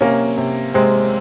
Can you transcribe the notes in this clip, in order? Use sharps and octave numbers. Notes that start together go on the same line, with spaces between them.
C3 A#3 C#4
C3
C3 G#3 C4